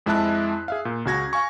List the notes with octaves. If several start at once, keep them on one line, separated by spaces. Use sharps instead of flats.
F2 G#3 E4 E5 A5 F#6
G#4 E5 F5
A#2
C#2 C#3 F#4 G#6 A#6
F5 G#5 C#6